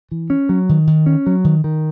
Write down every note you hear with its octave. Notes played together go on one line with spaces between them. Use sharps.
E3
C#4
F#3
D#3
D#3
C#4
F#3
D#3
D#3